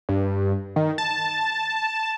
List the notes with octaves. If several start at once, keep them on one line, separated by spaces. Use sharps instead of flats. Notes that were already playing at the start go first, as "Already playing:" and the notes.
G2
D#3
A5